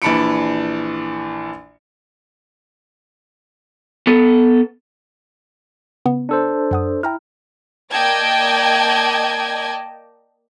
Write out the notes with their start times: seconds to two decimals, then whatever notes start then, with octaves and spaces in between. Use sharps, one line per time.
0.02 A#1 E3 D4 B5 C#7 D7
4.07 B3 A4
6.06 C#3 B3
6.29 D4 A4 C5
6.71 F#2 F#5 D#6
7.03 E4 G5 A#5 F6
7.93 A#3 D5 D#5 G5 A5 G#6